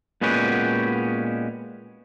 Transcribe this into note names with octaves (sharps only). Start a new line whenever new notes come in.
A#2 G#3 B3 C#4 F#4 G4